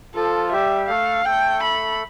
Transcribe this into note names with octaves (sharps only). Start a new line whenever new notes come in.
F3 F4 A4
G3 G4 E5
A3 A4 F5
A3 A4 G5
B5